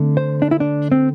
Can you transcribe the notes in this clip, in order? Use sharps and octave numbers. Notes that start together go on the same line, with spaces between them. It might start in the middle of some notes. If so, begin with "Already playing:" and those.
Already playing: D3 A3 C4
C5
D4
E4
D4
C4